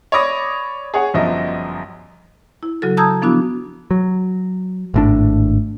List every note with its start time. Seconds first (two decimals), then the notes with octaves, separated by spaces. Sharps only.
0.12 C#5 D5 B5 D6 D#6 A#6
0.94 G#4 C#5 F#5
1.14 G1 F#2 F3 D#5 E5
2.63 E4
2.82 C#3 F#3 F#4 A4
2.97 A5 A#5 D#6 E6 G6 G#6
3.22 F3 B3 D4 E4 F#4
3.91 F#3
4.94 G#1 A2 D4